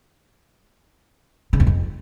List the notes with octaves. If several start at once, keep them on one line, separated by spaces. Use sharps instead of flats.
C#3
E2
F2